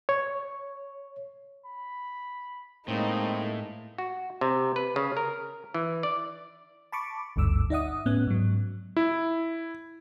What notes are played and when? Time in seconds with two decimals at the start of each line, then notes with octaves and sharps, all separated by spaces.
0.09 C#5
1.65 B5
2.88 A2 G#3 A#3 C4 D#4
3.98 F#4
4.41 C3
4.76 B4
4.96 C#3
5.17 A#4
5.74 E3
6.03 D5
6.92 A5 B5 C#6 D6
7.36 G#1 D2 G2 D6 E6
7.70 D#4 D5 E5 F#5 D#6
8.06 A2 B3 C#4 F#6
8.27 G#2 F#3
8.97 E4